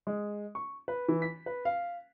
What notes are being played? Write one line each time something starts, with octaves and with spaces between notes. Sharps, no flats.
G#3
C#6
B4
E3
B6
B4
F5